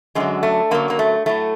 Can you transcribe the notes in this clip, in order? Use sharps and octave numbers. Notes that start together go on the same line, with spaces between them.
F#2 D3 F#3 G#3
A3
F#2 D3 F#3 A#3
A#3
A3
A2 F#3 A3